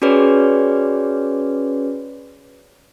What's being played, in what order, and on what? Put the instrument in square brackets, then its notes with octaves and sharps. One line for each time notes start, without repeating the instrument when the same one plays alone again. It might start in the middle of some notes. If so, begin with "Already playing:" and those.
[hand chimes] C#4 F#4 G#4 B4 C#5 D5